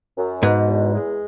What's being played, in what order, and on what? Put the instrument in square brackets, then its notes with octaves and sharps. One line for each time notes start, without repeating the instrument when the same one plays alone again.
[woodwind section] F#2
[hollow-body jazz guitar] G#2 [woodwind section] B2
[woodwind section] E2
G#3